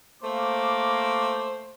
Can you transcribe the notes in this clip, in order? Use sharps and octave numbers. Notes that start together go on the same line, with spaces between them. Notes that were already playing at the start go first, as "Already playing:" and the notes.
A3 A#3 C5 D6